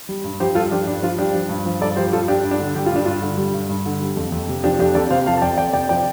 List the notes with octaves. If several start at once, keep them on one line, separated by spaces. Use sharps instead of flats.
G3
G2
F3 G4 C5
G2 F4 A4
F3 D4 G4
G2 D4
F3 F4
G2 D4 G4
F3
G2
F3
G2 A4 D5
F3 G4 C5
G2 F4 A4
G2 D4 G4
G2
D4
D3
G3 G4
F4
G2 D4
G2 F4
D3
G3
G2
G2
D3
G3
F2
F2
C3
F3 D4 G4
F2 D4 G4
F2 A4 D5
C3 C5 F5
F3 F5 A5
A5
F2 D5 G5
F2 D5 G5
C3 D5 G5
F3 D5 G5